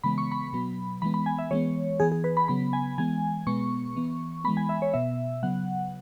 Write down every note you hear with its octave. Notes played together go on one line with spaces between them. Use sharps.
C#3 E3 G#3 B3 B5
C#6
B5
B2 F#3 B3
E3 G#3 B3 B5
B5
G#5
E5
E3 G#3 B3 C#5
E3 B3 G#4
G#4
B4
B5
C#3 F#3 B3 B5
G#5
E3 G#3 B3 G#5
B2 G#3 B3 C#6
E3 B3
E3 G#3 B3 B5
G#5
E5
C#5
B2 B3 E5
C#3 F#3 B3 F#5